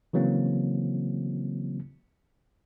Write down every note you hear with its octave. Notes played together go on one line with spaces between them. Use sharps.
C#3 E3 F#3 A#3 C4